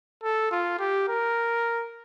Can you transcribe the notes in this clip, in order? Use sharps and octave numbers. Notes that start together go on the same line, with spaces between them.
A4
F4
G4
A#4